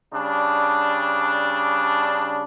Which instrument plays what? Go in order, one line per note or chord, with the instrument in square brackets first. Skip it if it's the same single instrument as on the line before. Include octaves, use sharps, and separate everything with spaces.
[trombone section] C#3 G3 D4